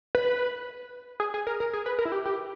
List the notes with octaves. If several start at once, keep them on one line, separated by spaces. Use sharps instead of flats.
B4
G#4
G#4
A#4
A#4
G#4
B4
A#4
E4
G4
G4